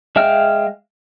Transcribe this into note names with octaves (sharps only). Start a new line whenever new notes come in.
G#3 E5 F5 G5 F6